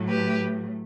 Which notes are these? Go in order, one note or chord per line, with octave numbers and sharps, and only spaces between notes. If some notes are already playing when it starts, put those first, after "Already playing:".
Already playing: A2 F#3 A3
G4 B4